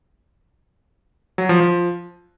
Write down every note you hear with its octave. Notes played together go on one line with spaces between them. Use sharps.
F#3
F3
F3